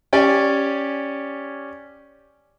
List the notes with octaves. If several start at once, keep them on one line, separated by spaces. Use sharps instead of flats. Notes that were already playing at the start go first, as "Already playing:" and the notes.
C#4 G4 D5 G#5